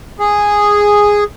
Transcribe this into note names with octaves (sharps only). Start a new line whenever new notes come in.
G#4